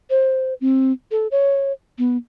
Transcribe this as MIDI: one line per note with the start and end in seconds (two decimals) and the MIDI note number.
0.10 0.54 72
0.61 0.92 60
1.11 1.27 69
1.31 1.72 73
1.98 2.17 59